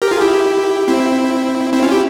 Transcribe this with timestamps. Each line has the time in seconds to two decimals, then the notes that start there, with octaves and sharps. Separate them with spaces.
0.02 G4 A#4
0.11 F4 G#4
0.21 E4 G4
0.88 C4 E4
1.73 C4 E4
1.83 C#4 F4
1.91 E4 G4